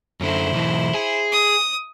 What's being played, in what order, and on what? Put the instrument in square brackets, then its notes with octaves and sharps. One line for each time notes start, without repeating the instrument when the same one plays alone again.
[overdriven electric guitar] F#2 D3 [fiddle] E4 C5
[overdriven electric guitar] B1 E3
G#4
[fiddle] D#6